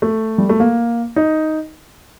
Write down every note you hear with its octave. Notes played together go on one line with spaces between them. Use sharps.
A3
G3
A3
A#3
D#4